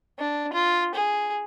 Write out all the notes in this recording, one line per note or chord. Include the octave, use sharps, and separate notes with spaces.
D4
F4
G#4